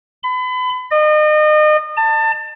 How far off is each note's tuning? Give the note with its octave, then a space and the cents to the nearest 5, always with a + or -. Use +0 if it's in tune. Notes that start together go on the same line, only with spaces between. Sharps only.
B5 +35
D#5 -35
A5 +25